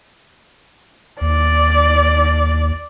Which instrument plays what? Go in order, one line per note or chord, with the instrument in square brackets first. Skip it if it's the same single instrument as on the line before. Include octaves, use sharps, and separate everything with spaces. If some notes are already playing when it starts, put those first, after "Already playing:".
[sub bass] D#2 [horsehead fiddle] D5